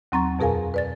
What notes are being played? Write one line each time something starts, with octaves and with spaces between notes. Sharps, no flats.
D#2 F#3 C4 A#5 C#6 A6
F2 B2 G#4 A#4 F5 G#5
B4 D5 A6